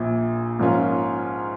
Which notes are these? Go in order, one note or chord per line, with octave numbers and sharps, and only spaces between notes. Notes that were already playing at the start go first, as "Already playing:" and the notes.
Already playing: A#1 A#2
G#2 F3 A#3 C#4 F4